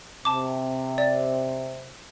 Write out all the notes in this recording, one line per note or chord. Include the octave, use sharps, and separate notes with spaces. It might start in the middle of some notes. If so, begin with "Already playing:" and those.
C3 A5 D6
D5